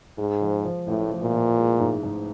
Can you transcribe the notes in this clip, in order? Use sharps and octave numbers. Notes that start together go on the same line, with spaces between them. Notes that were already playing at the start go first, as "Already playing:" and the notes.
G#2 G#3
F3
F3
A1 A2
F3
A#2
F3
G#3
G#2
G#2